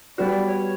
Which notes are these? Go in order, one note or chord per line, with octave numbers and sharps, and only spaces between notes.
G3 B3 F#4 D5
C#5